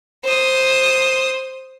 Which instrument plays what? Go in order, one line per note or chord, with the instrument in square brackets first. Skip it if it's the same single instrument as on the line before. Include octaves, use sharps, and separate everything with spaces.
[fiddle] C5 D#6